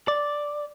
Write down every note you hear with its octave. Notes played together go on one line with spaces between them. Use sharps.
D5